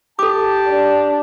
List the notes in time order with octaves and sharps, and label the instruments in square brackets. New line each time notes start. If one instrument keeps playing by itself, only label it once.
[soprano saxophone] G4 [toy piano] A4 D6 [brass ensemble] A5
[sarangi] D4